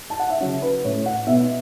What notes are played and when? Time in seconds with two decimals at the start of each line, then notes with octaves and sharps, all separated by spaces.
0.10 A5
0.19 F#5
0.30 E5
0.40 C#3 F#3 C#4 C#5
0.62 B4
0.84 A2 A3 C#4 C#5
1.06 F#5
1.27 B2 E5
1.31 B3